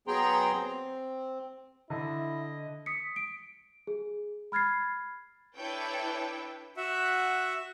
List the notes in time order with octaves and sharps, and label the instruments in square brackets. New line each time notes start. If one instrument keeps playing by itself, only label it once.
[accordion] F#3 B3 G#4 G5 A#5 C6
C4
[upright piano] D3 [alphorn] E4 [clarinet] D#5
[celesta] D#6 B6 C#7
D7
G#4
B5 F6 G#6 A6 C7
[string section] D4 E4 A4 B4 C#5 G5
[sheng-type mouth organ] F#4 E5 F#5